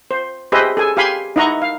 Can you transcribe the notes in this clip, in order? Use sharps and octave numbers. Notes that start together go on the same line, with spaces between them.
C5
G4 G#4 B4 C5 D#5 E5
G#4 A4 G#5
G4 F5 G#5 B5 C6
D#4 E4 D#5 F#5 A#5 C#6
F5